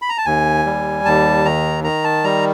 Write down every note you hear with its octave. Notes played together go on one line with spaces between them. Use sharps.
B5
A#5
A5
D#2 G#5
G3
D#2 A5
D#3 A#5
D#3 A#5
A5
G3 A#5